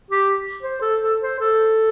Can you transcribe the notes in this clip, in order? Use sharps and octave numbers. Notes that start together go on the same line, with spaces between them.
G4
C5
A4
A4
C5
A4